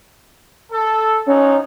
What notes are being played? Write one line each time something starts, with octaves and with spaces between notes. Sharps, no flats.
A4
F3 F#3 C#4 D#4